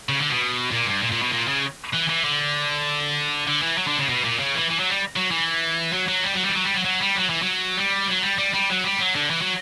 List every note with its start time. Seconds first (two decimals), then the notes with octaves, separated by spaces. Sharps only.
0.09 C#3
0.20 D3
0.30 B2
0.71 A#2
0.86 G2
1.01 A#2
1.11 A#2
1.22 B2
1.32 A#2
1.48 C#3
1.94 E3
2.09 E3
2.24 D3
3.47 D3
3.62 E3
3.78 F#3
3.88 D3
3.99 C#3
4.09 B2
4.24 A#2
4.39 C#3
4.54 E3
4.70 E3
4.80 F#3
4.90 G3
5.16 F#3
5.31 E3
5.93 F#3
6.08 F#3
6.24 G3
6.34 F#3
6.44 G3
6.50 E3
6.55 F#3
6.65 G3
6.74 F#3
6.85 F#3
7.01 G3
7.16 F#3
7.30 E3
7.42 F#3
7.77 G3
8.08 F#3
8.23 G3
8.38 G3
8.54 G3
8.70 F#3
8.84 G3
9.00 F#3
9.15 D3
9.30 E3
9.41 F#3